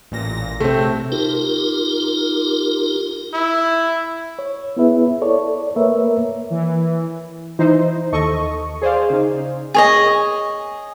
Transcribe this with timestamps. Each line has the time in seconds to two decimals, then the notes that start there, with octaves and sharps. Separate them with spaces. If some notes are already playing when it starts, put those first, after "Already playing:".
0.11 A1 A#2 A#6
0.60 C3 A3 C4
1.12 D#4 F4 G4 A#4
3.33 E4
4.39 C#5
4.77 B3 E4 G#4 B4 E5
5.22 A4 C#5 D5
5.76 A#3 A#4 B4 C#5 E5
6.50 E3
7.59 E3 D#4 E4 C5
8.12 D#2 A4 D#5 C#6
8.82 G#4 C5 D5 F5
9.10 C#3 D#4
9.74 G#4 C#5 D#5